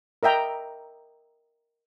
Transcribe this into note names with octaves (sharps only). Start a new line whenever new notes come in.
A#4 D#5 E5 G5 A#5